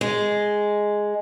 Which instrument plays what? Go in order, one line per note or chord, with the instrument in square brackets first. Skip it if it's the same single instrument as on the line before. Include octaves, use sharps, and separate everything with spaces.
[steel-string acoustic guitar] G#3